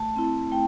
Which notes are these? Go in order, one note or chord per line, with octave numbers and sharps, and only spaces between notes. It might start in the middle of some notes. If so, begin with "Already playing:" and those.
Already playing: A3 A5
C4 E4
A3 G5